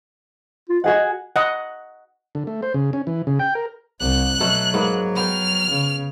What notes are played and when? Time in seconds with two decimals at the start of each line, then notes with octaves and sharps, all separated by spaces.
0.69 F4
0.84 F#4 G#4 D#5 F#5
1.36 D#5 F#5
2.35 D3
2.47 A3
2.62 C5
2.74 C#3
2.93 C#4
3.07 E3
3.27 C#3
3.40 G5
3.55 A#4
4.01 C2 F#6
4.40 B2 F#3 A3 A4
4.74 G#2 A#3 B3
5.16 B3 G5 F6
5.70 C#3